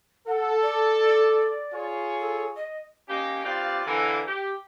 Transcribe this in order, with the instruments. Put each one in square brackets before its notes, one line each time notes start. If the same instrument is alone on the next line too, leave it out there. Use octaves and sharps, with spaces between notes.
[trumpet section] A4 [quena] F#5
[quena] D5
[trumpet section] F4 G#4 C#5
[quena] A4
D#5
[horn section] A#3 C#4 D#4 G4
G2 C4 F4 G4 D5 F5
D3 E3 A#3
G4